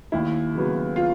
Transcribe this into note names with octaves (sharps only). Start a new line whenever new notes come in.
D#2 E4
C#3 F#3 B3
F4